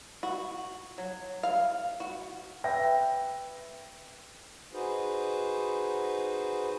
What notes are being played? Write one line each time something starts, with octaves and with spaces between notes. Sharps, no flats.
F#4
F#3
F5
F#4
B4 E5 G5 A#6
D#4 F#4 G#4 B4 C5